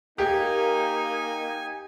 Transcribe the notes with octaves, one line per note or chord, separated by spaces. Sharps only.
A#3 D#4 G4 G#5